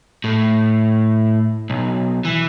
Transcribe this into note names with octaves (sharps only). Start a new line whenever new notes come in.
A2
B1
E3